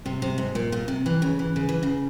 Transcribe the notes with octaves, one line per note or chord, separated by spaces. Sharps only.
C3
C3
G#2
A#2
A#2
C3
E3
C#3
E3
C#3
E3
C#3